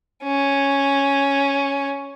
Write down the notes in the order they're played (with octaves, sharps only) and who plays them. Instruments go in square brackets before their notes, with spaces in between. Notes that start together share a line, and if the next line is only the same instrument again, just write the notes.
[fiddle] C#4